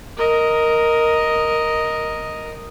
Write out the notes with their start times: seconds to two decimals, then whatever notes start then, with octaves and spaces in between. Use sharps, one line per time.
0.17 A#4 D#5